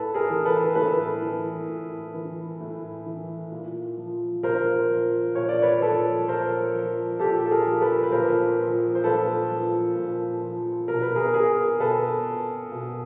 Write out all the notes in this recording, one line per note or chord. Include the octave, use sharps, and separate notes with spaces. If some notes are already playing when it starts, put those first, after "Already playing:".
Already playing: A2 A4 B4
G#4 A#4
E3
A4 B4
A2 A4 B4
E3
A2
E3
A2
E3
A#2
F3
A#2 A#4 C5
F3
A#2 C#5
D5
B4 C#5
F3 A4 B4
A#2 A#4 C5
F3
A#2 G4 A4
A4
G#4 A#4
F3
A4 B4
B4
A#2 A#4 C5
F3
C5
A#2 A4 B4
F3
A#2
F3
B2 A#4
B4
G#4 A#4
G#4 A#4
B2 A4 B4
B2